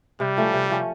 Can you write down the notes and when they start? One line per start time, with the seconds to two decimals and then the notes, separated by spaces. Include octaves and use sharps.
0.20 C3 G3
0.37 F3 A3 C#4
0.54 C3
0.70 F3 A3 C#4